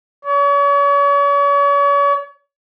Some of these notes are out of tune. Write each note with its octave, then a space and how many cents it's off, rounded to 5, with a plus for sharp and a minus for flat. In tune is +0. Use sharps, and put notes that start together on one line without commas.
C#5 +40